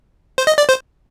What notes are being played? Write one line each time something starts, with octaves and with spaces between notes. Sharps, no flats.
C5
D#5
D5
C5